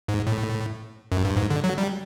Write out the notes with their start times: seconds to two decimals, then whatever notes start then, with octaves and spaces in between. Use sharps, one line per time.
0.08 G#2
0.27 A2
1.12 F#2
1.25 G2
1.37 G#2
1.50 D3
1.64 F#3
1.78 G3